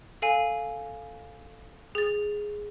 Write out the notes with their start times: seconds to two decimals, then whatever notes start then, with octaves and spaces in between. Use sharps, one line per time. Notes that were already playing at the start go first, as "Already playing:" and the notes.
0.22 A4 F5 G#5
1.95 G#4 A6